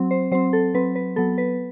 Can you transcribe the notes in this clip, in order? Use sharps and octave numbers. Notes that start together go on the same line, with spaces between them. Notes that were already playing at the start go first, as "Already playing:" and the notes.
Already playing: F#3 C4
C5
F#3 C4 C5
A4
F#3 C4 B4
B4
F#3 B3 A4
B4